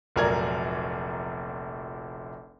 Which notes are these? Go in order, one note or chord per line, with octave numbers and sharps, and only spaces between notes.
F1 A#1 F#3 A#4 D5 G#6